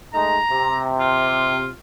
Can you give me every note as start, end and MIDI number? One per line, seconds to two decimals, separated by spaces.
0.14 0.38 56
0.14 0.38 57
0.14 0.38 63
0.14 0.85 82
0.51 1.67 48
0.99 1.73 65